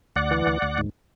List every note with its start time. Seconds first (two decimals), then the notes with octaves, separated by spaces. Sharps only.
0.16 D2 D5 F#5
0.31 E3
0.47 D2
0.62 D2
0.78 G#2